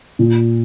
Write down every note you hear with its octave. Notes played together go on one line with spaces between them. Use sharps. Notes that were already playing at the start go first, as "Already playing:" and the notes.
A#2